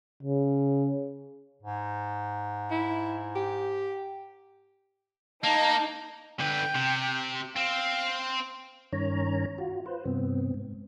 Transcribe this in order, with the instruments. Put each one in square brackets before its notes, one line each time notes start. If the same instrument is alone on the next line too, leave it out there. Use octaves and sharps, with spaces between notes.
[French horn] C#3
[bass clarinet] G#2
[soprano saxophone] E4
G4
[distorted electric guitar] A#3 [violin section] D#4 [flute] A5
[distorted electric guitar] D3 B4 [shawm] G5
[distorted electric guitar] C3
[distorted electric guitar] C4 [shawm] F5
[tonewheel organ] G2 D#3 C#4 C#5 A#5
F4 F#4
F4 B4 C5
G2 C3 B3 C4
G#2